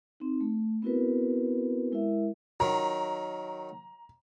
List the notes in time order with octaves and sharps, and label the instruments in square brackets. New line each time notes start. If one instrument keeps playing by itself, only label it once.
[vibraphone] C4 D#4
A3
B3 C4 E4 F#4 A#4 B4
G#3 E4 A#4 E5
[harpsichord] D#3 F#3 [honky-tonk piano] A#5